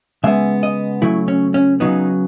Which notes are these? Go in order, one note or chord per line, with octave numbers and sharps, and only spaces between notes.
C#3 G#3 B3 E5
D#5
C#3 F#3 A3 E4
C#4
C#4
C#3 F#3 B3 D#4